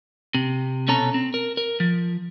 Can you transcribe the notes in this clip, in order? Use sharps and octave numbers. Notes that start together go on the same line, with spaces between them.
C3
B2 C#4 A4 A#5
C4
A#4
A#4
F3